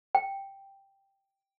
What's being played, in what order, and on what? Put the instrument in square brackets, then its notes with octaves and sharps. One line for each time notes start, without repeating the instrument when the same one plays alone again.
[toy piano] G5